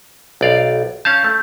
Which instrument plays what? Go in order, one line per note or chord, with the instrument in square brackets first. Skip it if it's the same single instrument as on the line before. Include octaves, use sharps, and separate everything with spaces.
[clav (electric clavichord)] B1 D5 F5
[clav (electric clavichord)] C#4 F5 A5 [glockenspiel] G6
[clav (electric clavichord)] A3